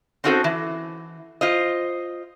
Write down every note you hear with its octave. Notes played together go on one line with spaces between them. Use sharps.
C4 C#4 D#4 F#4 A4 C5
E3
F4 C5 D#5